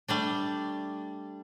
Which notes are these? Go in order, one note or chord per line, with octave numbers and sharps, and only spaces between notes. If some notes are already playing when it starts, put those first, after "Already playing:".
G3 A3 D4